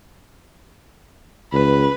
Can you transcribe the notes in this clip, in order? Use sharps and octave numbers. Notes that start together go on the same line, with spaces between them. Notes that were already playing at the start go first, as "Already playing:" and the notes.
C#2 B4